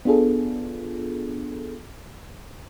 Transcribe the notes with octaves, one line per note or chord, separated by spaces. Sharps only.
B3 D4 F4 G#4 A4